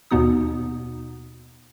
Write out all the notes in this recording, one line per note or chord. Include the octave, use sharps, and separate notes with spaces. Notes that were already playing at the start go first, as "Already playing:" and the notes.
D#2 B2 B3 D#4 D#6